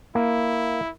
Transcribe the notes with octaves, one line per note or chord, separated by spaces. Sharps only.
A#3 E4